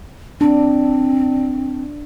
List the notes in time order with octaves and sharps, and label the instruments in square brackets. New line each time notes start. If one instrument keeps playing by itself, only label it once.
[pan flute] C4 [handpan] D4